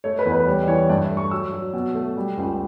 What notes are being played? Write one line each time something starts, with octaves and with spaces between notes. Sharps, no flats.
A3 C#5
B4
E2
B4
G3 C#5
D5
E3 C#5
G2 D5
E5
A3
C#6
F#3 E6
F#3
B2
A3
G3
C#2